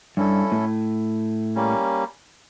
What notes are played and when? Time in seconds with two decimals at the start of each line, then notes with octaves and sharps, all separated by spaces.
0.17 G2 C#4 E4 A4
0.52 A2
1.56 G3 A#3 C#4